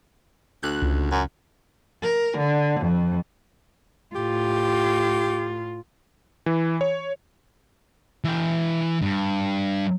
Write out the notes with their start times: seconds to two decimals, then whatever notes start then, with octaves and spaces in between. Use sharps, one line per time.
0.63 D2 F#6
0.82 C#2
1.11 F#2
2.03 A#4
2.38 D3
2.80 F2
4.16 A2 F4 G4
6.46 E3
6.81 C#5
8.24 E3 G5
9.02 G2